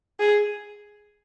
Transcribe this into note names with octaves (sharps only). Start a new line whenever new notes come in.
G#4